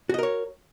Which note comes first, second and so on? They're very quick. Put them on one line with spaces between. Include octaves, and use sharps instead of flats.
F#4 D#5 A#4 C#5